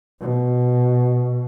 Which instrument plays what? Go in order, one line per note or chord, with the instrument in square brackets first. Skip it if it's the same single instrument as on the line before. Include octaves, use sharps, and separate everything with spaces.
[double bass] B2